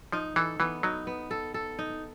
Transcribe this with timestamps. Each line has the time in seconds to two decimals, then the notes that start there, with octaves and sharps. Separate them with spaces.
0.12 F3 D#4
0.36 E3 A4
0.60 E3 B3
0.83 F#3 D#4
1.07 B3
1.31 A4
1.54 A4
1.79 D#4